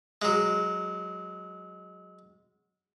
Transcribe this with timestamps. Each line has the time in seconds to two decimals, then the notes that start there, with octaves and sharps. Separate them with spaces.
0.22 F#3 G#3